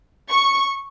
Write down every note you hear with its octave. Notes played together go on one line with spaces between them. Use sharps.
C#6